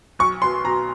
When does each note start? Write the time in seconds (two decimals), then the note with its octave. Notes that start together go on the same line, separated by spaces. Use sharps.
0.19 B1 C#6
0.42 B2 C6
0.65 B2 A#5